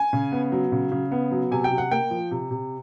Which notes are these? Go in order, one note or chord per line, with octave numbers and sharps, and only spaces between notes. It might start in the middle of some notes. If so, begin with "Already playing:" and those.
Already playing: G#5
C#3
B3
F#3
C#3
C#3
B3
F#3
C3 G#5
G5
C3
F#5
A#3 G5
F3
C3
C3